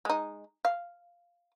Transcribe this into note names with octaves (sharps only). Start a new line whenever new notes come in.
G#3 D#4
F5